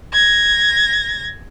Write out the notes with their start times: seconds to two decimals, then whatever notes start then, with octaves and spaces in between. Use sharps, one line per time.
0.13 G#6 A#6